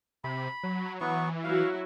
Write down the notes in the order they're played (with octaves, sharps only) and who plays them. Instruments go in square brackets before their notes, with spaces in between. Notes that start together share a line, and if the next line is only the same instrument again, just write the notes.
[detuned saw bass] C3 [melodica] B5
[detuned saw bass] F#3
[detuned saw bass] E3 [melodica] F#3 B3 C#6
[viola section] F#3 E4 F#4 [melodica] F5